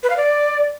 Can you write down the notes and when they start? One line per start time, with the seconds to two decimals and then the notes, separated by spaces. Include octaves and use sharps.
0.03 B4
0.10 F5
0.17 D5